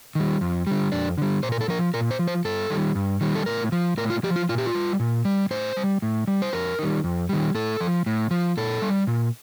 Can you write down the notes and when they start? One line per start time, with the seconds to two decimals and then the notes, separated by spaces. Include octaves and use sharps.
0.15 D#3 G3
0.41 F2
0.67 D3 G3
0.92 F2 D4
1.18 D3 G3
1.43 A#2 C5
1.52 A#4
1.61 A4
1.68 F3 A#4
1.94 A#2 A#4
2.11 C5
2.19 F3
2.27 C5
2.45 G2 A4
2.70 D#3 G3
2.95 G2
3.21 D#3 G3
3.35 A4
3.46 A2 A#4
3.72 F3
3.98 A2 A#4
4.10 F4
4.23 F3 G4
4.36 F4
4.49 A#2 F4
4.58 G4
4.66 F4
4.75 G3
5.00 A#2
5.25 G3
5.51 A2 C5
5.77 G3
6.02 A2
6.27 G3
6.42 C5
6.53 F2 A#4
6.79 D#3 G3
7.04 F2
7.29 D#3 G3
7.55 A2 A4
7.80 F3
8.06 A2
8.31 F3
8.57 A#2 A4
8.82 G3
9.07 A#2